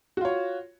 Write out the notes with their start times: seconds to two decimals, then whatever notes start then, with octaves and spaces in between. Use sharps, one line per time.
0.17 F#4
0.21 F4
0.25 C#5